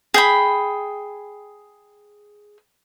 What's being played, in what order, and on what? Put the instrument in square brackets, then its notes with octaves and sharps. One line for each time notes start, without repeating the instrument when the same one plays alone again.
[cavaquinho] G#4 G5 B5